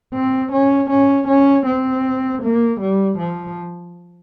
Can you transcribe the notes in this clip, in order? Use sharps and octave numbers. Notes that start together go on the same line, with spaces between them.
C4
C#4
C#4
C#4
C4
A#3
G3
F3